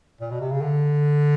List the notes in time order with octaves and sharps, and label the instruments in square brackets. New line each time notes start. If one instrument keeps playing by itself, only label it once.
[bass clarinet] A#2
B2
C3
C#3
D3